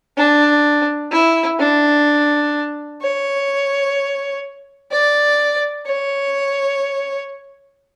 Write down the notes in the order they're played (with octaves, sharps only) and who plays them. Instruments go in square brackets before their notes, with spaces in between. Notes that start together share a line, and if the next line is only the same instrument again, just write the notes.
[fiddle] D4
E4
D4
C#5
D5
C#5